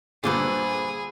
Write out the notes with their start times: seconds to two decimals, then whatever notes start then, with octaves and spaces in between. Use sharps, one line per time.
0.24 G2 A#2 D3 G#4 B4 C5 D6